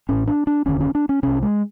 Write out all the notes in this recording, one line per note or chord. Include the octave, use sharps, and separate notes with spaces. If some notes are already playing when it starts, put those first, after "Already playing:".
A1 A2 C#4
D4
D4
F1 D#2 D3 C#4
C#4
D4
C#4
C2 C3 C#4
G#3